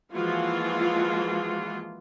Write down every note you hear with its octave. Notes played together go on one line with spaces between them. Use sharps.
E3 F3 G#3 A#3 F4 F#4